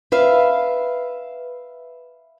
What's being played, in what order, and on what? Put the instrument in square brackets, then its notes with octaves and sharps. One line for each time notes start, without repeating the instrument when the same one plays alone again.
[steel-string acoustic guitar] B4 E5 F5